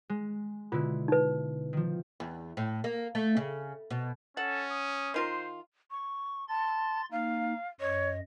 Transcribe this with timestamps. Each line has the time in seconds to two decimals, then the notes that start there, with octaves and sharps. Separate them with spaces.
0.10 G#3
0.72 B2 D3 E4 F4
1.08 D#4 B4
1.73 D#3 F3
2.20 E2
2.57 A2
2.84 A#3
3.15 A3
3.37 C#3
3.91 B2
4.37 C#4 A4 F#5
4.71 D#6
5.14 D#3 F4 A#4 C5
5.91 C#6
6.49 A5 C6 A6
7.12 A#3 D#4 F5
7.80 F#2 C#5 D#5